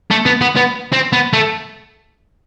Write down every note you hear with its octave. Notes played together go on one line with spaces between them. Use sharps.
A3
B3
B3
B3
C4
B3
A3